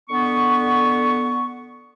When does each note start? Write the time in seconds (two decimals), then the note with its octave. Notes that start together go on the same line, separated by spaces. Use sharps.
0.09 D3 B3 C#6